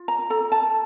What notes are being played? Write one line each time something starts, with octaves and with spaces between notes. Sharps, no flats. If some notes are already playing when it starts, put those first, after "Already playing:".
Already playing: F4
A#5
A4 A#5
A5